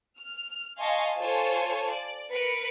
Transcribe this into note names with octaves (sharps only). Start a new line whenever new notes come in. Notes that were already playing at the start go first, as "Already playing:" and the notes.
F6
D#5 F5 G#5 A5 C6 C#6
F4 A4 C5 C#5 G#5 A5
D5
A#4 B4 B6 C#7 D7